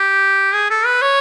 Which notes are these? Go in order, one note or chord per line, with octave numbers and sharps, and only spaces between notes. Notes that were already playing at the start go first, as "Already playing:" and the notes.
Already playing: G4
G#4
A4
B4
C#5